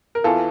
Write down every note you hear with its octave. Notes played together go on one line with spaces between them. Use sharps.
A#4
E2 E3 F4 A4